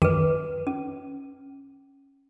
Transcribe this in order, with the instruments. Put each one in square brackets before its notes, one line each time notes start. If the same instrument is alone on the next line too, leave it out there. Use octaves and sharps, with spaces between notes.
[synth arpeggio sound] F#2 D#3 D#7 [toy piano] G#4 B4
[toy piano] C#4